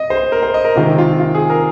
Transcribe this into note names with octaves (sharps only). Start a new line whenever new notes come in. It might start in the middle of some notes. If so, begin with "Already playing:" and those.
Already playing: C3 D#5
C5
A#4
C5
D#5
A#4
C3 D#3 G#3 C4 F4
F4
F4
G#4
A#4